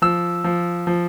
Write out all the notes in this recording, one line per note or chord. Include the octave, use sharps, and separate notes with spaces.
F3 E6
F3
F3